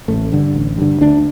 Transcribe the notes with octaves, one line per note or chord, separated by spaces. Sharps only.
A1 A3
G2 D3
A1
G2 D3
D2 D4